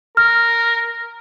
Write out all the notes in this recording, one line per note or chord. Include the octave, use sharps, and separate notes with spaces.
A#4 F6